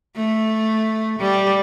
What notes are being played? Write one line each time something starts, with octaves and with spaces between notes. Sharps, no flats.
A3
G3